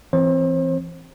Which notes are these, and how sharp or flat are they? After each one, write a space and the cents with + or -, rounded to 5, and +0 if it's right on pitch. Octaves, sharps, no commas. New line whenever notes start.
E3 +25 C4 +0 C5 +40